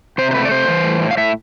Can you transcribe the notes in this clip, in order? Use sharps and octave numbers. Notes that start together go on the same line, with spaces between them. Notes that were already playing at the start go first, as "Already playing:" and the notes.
C3 C5
C5
A3 B4
D5
C3 C5
E3
A2
A2
F5
A2 E5